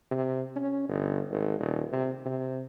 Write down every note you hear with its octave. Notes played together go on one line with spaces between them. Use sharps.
C3
C#4
G1
G#1
D#1
C3
C3